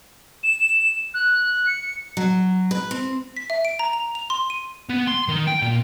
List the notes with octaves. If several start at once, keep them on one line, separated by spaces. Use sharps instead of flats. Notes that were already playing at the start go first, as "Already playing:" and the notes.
E7
F#6
C#7
F#3
B4
C4
B6
E5
D7
A#5
F7
F7
C6
D#7
B3
C6
D#3
G5
A#2